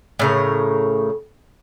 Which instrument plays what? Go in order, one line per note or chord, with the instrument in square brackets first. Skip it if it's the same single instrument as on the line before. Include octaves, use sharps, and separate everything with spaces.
[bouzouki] A2 C#3 A#4